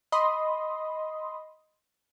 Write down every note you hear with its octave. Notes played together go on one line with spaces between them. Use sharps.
D#5 B5 C6 D#6